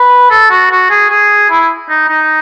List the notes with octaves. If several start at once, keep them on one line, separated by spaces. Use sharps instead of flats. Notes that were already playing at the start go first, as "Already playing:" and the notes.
Already playing: B4
A4
F#4
F#4
G#4
G#4
E4
D#4
D#4